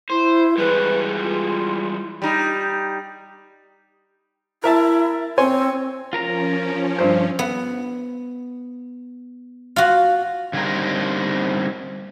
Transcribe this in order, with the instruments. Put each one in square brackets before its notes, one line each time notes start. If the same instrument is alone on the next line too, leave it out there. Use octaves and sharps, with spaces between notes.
[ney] E4 [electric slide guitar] C5
[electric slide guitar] E3 G3 G#3 [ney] B4
[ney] F4
[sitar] G3 D#4
[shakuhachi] E4 [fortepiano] A#4 E5 A5
[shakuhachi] C4 [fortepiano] C#5 G#5 C6
[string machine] F3 C#4 [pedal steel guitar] F4 A#4 A#5
[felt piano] G2 C5
[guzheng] B3
F4 F#4
[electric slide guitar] D3 G3 A#3 C4 D#4 A#4